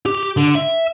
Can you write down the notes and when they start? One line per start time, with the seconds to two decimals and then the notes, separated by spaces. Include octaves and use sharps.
0.06 G4
0.37 D3
0.55 E5